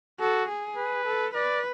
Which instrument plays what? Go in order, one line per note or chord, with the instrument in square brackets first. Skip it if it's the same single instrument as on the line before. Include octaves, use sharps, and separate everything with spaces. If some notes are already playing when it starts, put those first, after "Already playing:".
[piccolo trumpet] F#4 [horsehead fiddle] A4
[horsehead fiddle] G#4
[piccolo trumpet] B4
[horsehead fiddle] A4
[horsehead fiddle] B4 [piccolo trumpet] D5